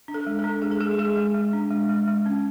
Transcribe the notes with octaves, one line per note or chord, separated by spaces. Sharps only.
D4
A4
G#3
A4
D4
G#3 G#4
A4
G#3 G#4
G#3 G#4
G#3
G#3
D4
G#3
G#3
G#3
C#4